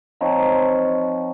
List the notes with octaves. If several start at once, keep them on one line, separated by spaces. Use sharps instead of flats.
F3 C4 D#4 C#5